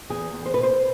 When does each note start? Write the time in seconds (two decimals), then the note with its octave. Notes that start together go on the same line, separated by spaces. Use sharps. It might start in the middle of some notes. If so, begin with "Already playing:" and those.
0.10 E2 G#4
0.33 E2
0.46 C5
0.54 B2 B4
0.63 C5